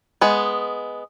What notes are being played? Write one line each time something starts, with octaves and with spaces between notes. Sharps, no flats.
G#3 B3